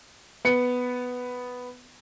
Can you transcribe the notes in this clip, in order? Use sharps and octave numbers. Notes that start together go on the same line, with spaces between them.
B3 C#7